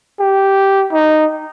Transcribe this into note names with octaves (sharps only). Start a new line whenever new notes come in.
G4
D#4